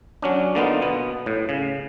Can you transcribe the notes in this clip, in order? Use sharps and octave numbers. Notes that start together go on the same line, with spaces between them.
F#3 C#4 D4
D3 A#3 B3 D#4 F4
B2 B3
A2
C#3